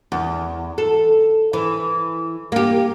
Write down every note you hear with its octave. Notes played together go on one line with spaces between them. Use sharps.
E2
A4
E3
A#3 G4